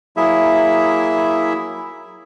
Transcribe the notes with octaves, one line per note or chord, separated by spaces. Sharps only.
F#3 A#3 E4 G#4 E5